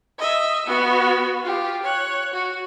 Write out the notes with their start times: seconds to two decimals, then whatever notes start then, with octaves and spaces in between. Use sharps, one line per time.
0.19 D#5 E5
0.67 B3 F#4
1.43 F4 G4
1.83 C#5 F#6
2.34 F#4